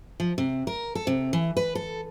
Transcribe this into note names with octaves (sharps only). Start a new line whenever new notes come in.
F3
C3
A#4
A4
C3
E3
B4
A4